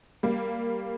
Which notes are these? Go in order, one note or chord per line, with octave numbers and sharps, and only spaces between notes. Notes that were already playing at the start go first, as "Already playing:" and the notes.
G3 A#3